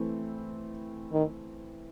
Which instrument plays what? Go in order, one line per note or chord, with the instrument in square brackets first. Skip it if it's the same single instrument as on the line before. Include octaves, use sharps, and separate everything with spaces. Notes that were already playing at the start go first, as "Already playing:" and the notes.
Already playing: [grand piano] E3 A3 C4 E4
[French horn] D#3